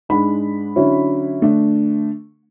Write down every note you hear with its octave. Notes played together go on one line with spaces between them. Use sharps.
G#2 G#3 D4 B5
D3 F#3 C#4 E4
D3 A3 D4